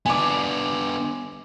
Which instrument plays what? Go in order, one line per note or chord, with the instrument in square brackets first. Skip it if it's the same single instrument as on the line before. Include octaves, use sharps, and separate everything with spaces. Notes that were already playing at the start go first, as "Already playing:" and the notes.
[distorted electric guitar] B3 D4 [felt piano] G#5 D6